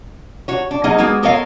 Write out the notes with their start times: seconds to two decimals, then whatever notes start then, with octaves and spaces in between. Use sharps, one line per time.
0.48 F#4 C#5
0.71 D4
0.84 F#3 A#3 B3 D#4 G#4 D#5
0.98 G#3 A#3 B3 F#4 G#4
1.23 B3 A4 A#4 C#5 D#5 F5